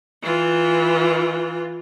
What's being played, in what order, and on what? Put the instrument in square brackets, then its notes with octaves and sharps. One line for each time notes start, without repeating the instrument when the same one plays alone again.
[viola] E3 F4